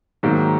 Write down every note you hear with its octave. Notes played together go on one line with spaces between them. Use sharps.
G#2 D#3 F#3 A#3